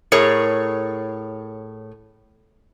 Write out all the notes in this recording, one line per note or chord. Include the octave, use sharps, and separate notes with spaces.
A2 G#4 A#4 C#5